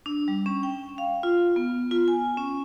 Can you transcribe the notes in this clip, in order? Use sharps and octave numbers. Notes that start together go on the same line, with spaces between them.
D4
G3
C#4
G5
F5
F4
B3
F4
G#5
C#4